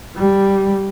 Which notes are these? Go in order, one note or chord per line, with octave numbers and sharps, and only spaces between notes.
G3